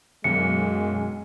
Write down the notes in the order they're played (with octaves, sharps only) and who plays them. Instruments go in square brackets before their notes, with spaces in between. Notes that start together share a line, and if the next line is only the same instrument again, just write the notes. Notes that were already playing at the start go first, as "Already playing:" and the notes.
[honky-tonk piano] B1 [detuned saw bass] F#2 [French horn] G#3 [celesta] C#7